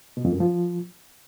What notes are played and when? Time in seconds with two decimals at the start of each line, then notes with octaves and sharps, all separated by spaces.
0.17 B2
0.25 F2
0.32 F#2
0.40 F3